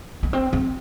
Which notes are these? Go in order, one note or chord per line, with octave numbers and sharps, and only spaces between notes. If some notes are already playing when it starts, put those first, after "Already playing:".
B3
C4
C4